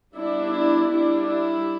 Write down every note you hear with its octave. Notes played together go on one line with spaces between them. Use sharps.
G3 B3 D4 E4
E4
G3 E4
D4
E4